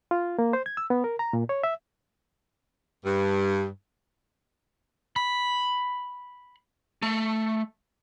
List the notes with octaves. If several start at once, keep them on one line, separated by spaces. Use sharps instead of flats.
F4
A#3
C5
G#6
E6
B3
A#4
A#5
A#2
C#5
E5
G2
B5
A3